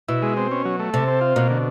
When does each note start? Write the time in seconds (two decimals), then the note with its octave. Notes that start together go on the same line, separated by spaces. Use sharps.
0.08 B2 E4
0.22 G#3
0.37 C4
0.51 C#4
0.65 F#3
0.79 A3
0.93 C3 A4
1.08 C4
1.21 F4
1.36 B2 A#3
1.50 D3